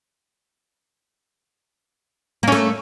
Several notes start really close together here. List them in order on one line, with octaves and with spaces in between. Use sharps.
A#3 C#4 A3